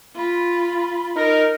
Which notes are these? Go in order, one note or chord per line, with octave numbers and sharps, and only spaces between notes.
F4 B5
D#4 A#4